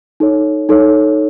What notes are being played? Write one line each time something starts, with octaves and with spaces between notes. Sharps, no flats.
D#4 A4 C#5
D#4 A4 C#5